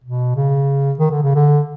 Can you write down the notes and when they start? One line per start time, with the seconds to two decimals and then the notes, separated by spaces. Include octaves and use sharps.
0.04 B2
0.36 C#3
0.99 D#3
1.11 D3
1.23 C#3
1.35 D3